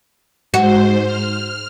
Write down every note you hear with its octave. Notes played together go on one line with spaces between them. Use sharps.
G#2 F#4 C5
F6